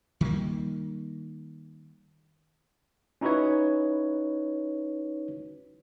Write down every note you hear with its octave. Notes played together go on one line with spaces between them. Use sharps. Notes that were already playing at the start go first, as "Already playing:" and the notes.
D#3 G3 A3 A#3
C#4 D#4 E4 F#4 B4 C#5